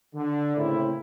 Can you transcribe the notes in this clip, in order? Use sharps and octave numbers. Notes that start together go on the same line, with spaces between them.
D3
A2 C#3 A#3 C4 E4